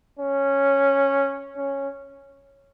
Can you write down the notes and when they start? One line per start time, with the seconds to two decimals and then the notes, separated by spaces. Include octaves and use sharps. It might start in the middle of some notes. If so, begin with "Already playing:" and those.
0.19 C#4
1.58 C#4